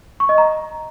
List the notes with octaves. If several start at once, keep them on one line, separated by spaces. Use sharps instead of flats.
C#6
D#5
A#5